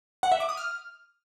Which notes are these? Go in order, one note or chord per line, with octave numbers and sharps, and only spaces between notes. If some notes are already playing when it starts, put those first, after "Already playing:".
F#5
E5
D6
D#6
F6